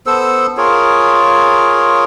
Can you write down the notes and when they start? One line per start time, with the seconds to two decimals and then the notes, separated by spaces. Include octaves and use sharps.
0.06 B3 A4 C5 E6
0.57 F4 G#4 A#4 C#5